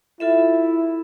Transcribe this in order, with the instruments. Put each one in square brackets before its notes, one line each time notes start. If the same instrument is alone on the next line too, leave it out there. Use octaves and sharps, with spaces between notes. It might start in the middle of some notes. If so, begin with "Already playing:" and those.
[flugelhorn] E4 [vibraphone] F4 A4 E5